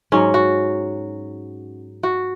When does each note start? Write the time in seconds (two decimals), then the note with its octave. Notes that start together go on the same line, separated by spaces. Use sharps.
0.12 G#2 F#3 C#4
0.34 F#4
2.03 F#4